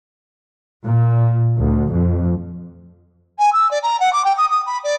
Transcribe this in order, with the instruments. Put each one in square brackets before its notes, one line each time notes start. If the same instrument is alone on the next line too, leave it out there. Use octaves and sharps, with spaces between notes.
[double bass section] A#2
D2
F2
[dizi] G#5
E6
D5
A#5
F#5
D6
G5
D#6
D#6
B5
D5